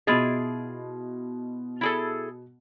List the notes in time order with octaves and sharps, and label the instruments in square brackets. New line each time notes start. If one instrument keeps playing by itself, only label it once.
[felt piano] B2 D#5 [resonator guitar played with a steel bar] E4 F4 G#4
[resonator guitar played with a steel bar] E4 G#4 A4